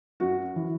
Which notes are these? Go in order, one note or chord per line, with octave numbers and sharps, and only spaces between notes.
F#2 F#4
E3